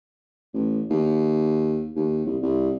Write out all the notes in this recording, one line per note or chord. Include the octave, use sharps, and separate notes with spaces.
A1
D#2
D#2
C2
C2